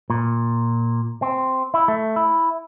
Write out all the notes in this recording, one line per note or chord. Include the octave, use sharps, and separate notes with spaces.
A#2
C4
E4
A3
E4